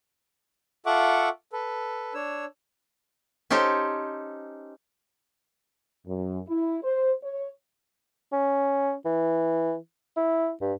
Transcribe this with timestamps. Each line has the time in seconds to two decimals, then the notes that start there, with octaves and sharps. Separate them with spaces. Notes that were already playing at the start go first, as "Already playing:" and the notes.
0.86 F4 A4 E5 F#5 C#6 D6
1.53 A4 B4
2.14 D4 C#5 E6
3.50 C#4 D#4 G4 A4 C5 C#5
6.06 F#2
6.48 E4
6.83 C5
7.23 C#5
8.32 C#4
9.05 E3
10.17 E4
10.61 G2